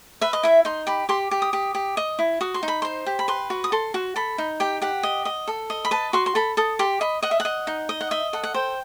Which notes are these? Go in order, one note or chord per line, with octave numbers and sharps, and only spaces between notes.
B4 E5
D#5
E4 E5
D#4 C6
G4 B5
G4 C6
G4
D#6
G4
G4
D#5
E4
F#4 D#6
C6
D#4
B5
C5 C6
G4
B5
B4 C6
F#4
D#6
A4 C6
F#4
A4 B5
D#4
G4 G5
G4 F#5
D#5
D#5
A4
D#5
B5
B4 A5
F#4 C6
C6
A4 B5
A4 D#6
G4 C6
D#5 B5
D#5 F#5
E5
F#5
D#5
D#4
D#5
F#5
D#5 E5
A4 F#5
F#5
C5 G5